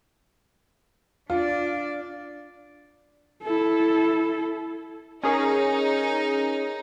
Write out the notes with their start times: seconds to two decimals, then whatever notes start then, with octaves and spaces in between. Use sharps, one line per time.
1.30 D4 F4 D5
3.43 E4 A4
5.24 C#4 D#4 G#4 A#4